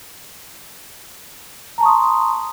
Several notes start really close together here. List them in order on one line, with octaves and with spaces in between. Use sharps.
A#5 A5 C#6 D#6 C6